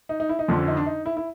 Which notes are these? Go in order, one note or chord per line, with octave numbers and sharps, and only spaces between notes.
D#4
D#4
E4
D#4
F2 D3 F3
C#4
D#4
D4
D#4
E4
E4